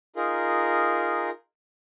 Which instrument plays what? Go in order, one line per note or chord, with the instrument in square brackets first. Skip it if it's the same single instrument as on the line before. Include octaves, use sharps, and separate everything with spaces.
[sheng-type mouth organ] D#4 F4 G#4 A#4